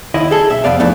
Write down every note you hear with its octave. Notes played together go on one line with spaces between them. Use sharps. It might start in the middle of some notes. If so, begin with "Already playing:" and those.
D#2 E4 D#5
G#4 A4
B1 E5
F2 C3 B3 D5 F5
E2 E3 F3 A3 D4